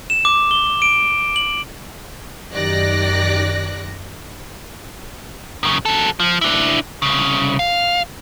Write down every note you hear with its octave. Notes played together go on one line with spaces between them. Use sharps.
E7
D6
G7
D7
F#7
F#2 D#3 G4 D5 F#6 A#6
F#2 C#3
F#3 A4
F3
D4 E4
C2 C#3
F5